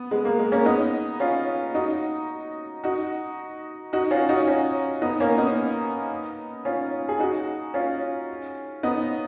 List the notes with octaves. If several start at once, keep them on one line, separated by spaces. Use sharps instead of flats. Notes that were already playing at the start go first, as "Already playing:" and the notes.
Already playing: B3
G#3 B3
A#3
G#3
A#3 C#4
B3 D#4
C#4 F4
D#4 F#4
D#4 F#4
D#4 F#4
C#4 F4
D#4 F#4
C#4 F4
B3 D#4
A#3 C#4
B3 D#4
C#4 F4
G#4
D#4 F#4
C#4 F4
B3 D#4